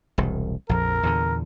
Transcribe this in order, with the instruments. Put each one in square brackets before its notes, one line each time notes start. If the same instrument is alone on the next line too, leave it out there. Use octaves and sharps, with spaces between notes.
[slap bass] E1 C2
[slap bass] A#1 F2 [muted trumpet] A#4
[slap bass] E2 A#2 D3